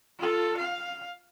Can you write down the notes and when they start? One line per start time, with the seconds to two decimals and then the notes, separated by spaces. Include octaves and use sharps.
0.19 F4 A4
0.57 F5